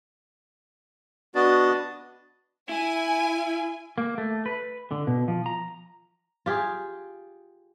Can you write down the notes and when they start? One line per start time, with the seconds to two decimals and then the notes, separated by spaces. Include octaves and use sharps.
1.35 B3 D4 F#4 D#5 A5
2.69 E4 G#5
3.98 A#3
4.18 A3
4.46 B4
4.91 D3
5.07 B2
5.28 F3
5.46 A#5
6.46 F4 G4 G#4